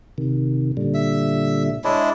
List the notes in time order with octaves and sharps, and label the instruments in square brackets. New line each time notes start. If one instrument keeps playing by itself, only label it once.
[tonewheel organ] C3 D#3
A#2 D3 G3
[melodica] E5
[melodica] G#3 D4 E4 [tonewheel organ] C#5